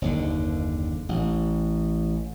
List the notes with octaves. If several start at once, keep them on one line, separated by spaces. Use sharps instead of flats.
F#1 D#2 D3
A1